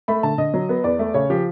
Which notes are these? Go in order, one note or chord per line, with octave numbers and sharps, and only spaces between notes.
A3 B5
D3 A5
D3 D#5
F#3
B3
E2 D5
A3
C#3 C#5
F3 G4